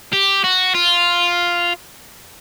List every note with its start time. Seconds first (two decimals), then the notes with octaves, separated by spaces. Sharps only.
0.13 G4
0.44 F#4
0.75 F4